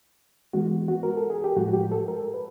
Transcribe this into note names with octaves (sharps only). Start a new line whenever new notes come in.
E3 G#3 B3 F#4
F#4
A#4
A4
G#4
G4
A2 F3 G#3 F#4
F#4
G4
A4
A#4
B4